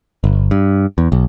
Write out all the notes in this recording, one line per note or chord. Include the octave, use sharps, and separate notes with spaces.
G1
G2
E2
B1